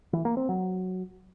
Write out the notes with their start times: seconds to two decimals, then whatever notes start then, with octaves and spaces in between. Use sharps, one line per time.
0.13 E3
0.25 A#3
0.37 C4
0.49 F#3